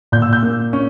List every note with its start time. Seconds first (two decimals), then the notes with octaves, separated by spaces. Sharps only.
0.12 A#2 G6
0.22 E6
0.33 G6
0.43 A#3
0.73 C#4